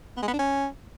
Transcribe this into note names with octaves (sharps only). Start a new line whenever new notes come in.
B3
G#3
B3
D4
C#4